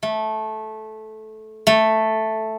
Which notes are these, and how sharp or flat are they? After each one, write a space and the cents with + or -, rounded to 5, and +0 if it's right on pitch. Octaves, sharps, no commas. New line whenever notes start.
A3 -15
A3 +0